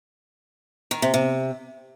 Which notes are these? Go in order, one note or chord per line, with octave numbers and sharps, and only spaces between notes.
D#3
C3
C3